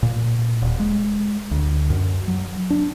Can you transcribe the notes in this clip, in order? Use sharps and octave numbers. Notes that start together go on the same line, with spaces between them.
A#2
D#1
G#3
D2
F#2
F#3
D4